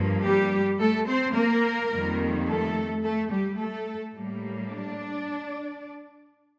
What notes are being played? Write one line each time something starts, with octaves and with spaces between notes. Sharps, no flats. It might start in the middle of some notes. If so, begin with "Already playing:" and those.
Already playing: G2 F3 A#3
G3 G4
A3 A4
C4 C5
A#3 A#4
F2 D#3 G3 A#3
A3 A4
A3 A4
G3 G4
A3 A4
A2 G3 A#3
D4 D5